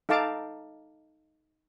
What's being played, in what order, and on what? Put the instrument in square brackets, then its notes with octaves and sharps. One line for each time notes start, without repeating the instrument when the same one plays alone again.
[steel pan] D#4 A4 F5 A5 D6